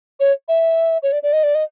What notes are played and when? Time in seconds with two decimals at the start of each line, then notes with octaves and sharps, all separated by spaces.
0.20 C#5
0.48 E5
1.03 C#5
1.12 D5
1.23 D5
1.33 D#5
1.43 D5
1.55 D#5